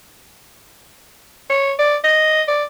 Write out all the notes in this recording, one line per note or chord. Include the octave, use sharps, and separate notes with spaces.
C#5
D5
D#5
D5